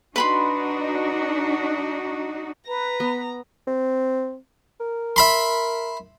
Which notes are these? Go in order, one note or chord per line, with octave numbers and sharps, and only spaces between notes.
D4 D#4 F#4 B4 B5 C6
B4 A#5
B3
C4
A#4
E5 B5 C6